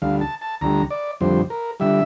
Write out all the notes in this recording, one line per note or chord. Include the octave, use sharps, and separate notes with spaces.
D2 D3 G3 F5
A5
A5
D2 D3 G3 A#5
D5
F2 D3 G3 C5
A#4
D3 G3 E5